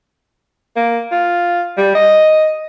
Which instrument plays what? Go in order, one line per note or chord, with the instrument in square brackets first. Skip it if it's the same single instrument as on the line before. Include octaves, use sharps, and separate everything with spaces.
[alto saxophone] A#3
F4
G3
D#5